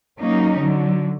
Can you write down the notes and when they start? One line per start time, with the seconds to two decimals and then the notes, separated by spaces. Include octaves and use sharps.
0.19 F#3 A#3 C#4 D#4
0.58 D3 F#3